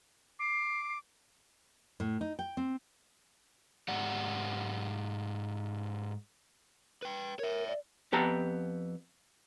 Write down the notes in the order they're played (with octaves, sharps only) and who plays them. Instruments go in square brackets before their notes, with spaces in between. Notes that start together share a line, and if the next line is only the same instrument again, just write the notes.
[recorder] D6 [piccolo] C7
[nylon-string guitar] A2
D#4
G5
C4
[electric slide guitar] G#2 G#3 G4 D5 F#5
[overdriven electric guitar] B4 G5
[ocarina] A#4 [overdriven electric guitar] C#5 E5
[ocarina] D5
[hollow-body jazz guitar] F2 B3 G4 A5 A#5